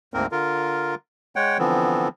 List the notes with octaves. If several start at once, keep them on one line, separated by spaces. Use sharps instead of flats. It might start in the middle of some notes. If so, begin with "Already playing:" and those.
D2 G#2 A#3 C4 A#4
D3 F4 A#4
G#3 C#5 F#5 G5
D3 E3 F3 B3 C4